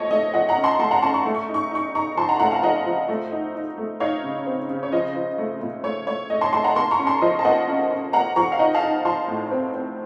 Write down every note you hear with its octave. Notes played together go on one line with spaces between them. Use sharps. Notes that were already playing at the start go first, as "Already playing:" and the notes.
Already playing: F3 A3 C#5 D#5 A5 C#6
A3 D#5
F3 D#5 F#5
F#5 A#5
C#4
A5 C6
A3 A5 C6
F#5 A#5
C#4 A5 C6
C#6
A3
C#6
D#4
C#6
D#4 C#6
D#4 A#5 C#6
F3 A5 C6
F#5 A#5
A3 F#5 A#5
F5 A5
F3 D#5 F#5
F3
A3
D#4
D#4
A3
D#4 C#5 F5
C#3
C4
C#3
C#5
F3 D#5
F3
A3
A#2
A3 C#5
A3 C#5
A3 D#5
A5 C6
A3 A5 C6
F#5 A#5
A#3 A5 C6
A#5 C#6
C#4
A5 C6
F3 D#5
A5
A#3 D#5 F#5
C#4
C#4
A#3 F#5 A#5
F3 A#5 C#6
F5
D#4 D#5 F#5
F5 A5
D#4
F3 A5 C6
A2
C4
C4